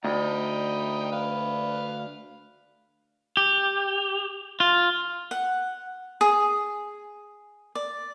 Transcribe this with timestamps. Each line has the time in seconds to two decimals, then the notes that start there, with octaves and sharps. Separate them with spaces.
0.04 D2 D#4 G5 B5
1.12 B4 F5
3.37 G4
4.60 F4
5.31 F#5
6.21 G#4
7.75 D5